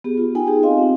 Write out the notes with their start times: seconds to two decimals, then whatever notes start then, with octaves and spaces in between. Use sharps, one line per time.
0.04 B3 G4 G#4
0.18 F4
0.35 D#4 A4 G5 G#5
0.47 D#4 G4 G#4
0.63 C4 F4 D#5 F5 C6
0.78 C4 D#4